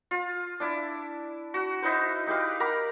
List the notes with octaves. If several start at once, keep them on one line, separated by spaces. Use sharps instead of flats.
F4
D4 E4
F#4
D#4 E4 B4 C5
D#4 G4 B4 F5
A#4 A#5 B5 D6